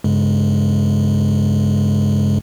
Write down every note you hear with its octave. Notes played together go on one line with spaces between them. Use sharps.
G2 C#3 G#3